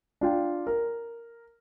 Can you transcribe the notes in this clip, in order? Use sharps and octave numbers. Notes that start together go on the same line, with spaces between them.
D4 F4 G5
A#4